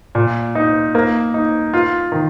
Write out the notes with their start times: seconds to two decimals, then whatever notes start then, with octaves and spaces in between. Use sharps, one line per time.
0.15 A#2
0.55 D#4
0.95 A#3
1.34 D#4
1.74 F4
2.12 D#3